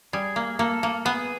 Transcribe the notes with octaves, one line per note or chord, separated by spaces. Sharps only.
G3 G#4
A#3
A#3 A4
A#3
B3 G#4